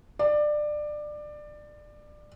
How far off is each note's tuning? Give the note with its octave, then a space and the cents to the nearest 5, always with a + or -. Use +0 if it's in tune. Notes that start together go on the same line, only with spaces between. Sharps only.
D5 +20